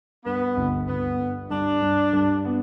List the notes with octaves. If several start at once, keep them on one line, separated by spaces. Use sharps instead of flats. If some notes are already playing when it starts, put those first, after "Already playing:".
G2 B3
G1
G1 B3
G2
G2 D4
G2
G2
B3